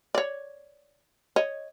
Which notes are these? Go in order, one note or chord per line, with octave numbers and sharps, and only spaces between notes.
C#5 D5
C#5 D#5